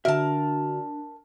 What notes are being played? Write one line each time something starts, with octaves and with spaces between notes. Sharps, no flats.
D3 D4 F#4 A#4 E5 A5